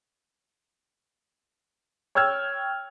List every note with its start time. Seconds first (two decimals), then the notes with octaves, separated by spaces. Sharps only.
2.15 C#5 G5 E6 F6 G#6